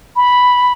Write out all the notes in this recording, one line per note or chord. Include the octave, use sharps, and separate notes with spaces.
B5